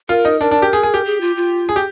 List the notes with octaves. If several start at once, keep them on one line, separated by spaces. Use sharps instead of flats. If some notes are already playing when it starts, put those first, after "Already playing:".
F4 A#4
D#4
D4 A#4
D4
G4
G#4
G#4
G4
G#4
F4
F4
G#4
G4